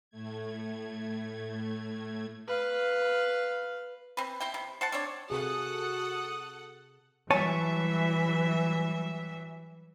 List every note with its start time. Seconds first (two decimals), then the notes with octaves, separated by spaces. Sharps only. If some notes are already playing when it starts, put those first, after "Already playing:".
0.10 A2 A3 G#6
2.47 B4 F5
4.17 C4 B4
4.40 C4 E4 G5
4.54 C3
4.81 C5 F#5 A5
4.92 C4 D4 C#5
5.30 C3 F#4 G#4 A4 F#5 D#6
7.30 E3 F#3 G3 C#5 E5 G#5 A5